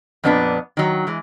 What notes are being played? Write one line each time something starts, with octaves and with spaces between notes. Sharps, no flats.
F2 A#2 B3 D4 E4 B4
D#3 F#3
E3 G#3